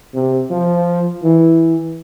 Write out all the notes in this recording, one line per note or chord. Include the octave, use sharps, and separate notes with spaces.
C3
F3
E3